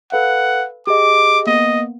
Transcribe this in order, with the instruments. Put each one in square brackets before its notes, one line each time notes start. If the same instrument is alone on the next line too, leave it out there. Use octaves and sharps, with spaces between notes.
[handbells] A4 B4 F5 [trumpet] F#5
[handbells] G4 G#4 D#5 [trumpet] D6
[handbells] A#3 B3 [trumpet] D#5